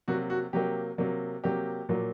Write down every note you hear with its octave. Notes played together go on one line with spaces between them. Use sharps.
C3 F#3 A#3 F#4
F#4
C3 F#3 A#3 G4
C3 F#3 A#3
C3 F#3 A#3 G4
A#2 F#3 A#3